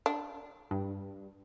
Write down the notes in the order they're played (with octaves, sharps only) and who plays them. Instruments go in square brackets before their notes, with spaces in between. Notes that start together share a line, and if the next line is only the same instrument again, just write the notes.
[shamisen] D4
[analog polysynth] G2